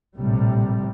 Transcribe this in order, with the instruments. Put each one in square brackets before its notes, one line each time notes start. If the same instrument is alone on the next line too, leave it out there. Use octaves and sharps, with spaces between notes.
[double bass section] A#1 A2 C3 G3